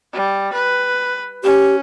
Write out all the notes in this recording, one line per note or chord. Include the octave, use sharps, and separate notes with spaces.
G3
B4
C#4 G4